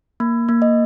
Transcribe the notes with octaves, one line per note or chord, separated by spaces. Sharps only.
A#3
A#3
D#5